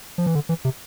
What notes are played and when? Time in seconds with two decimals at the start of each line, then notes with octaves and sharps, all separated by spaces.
0.18 F3
0.26 E3
0.35 D3
0.49 E3
0.65 C3